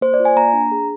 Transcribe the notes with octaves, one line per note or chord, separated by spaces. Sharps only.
A#3 C5
D5
F4
G#5
A#3 A#5
D4
G#4